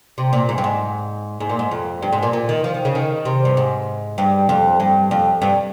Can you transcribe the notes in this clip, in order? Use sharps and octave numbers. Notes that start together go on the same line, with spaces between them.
C3
A#2
G#2
G2
G#2
G#2
A#2
G#2
F2
G2
G#2
A#2
A#2
D#3
F3
D#3
C#3
D#3
C3
G2
G#2
G2
F2
G2
F2
G2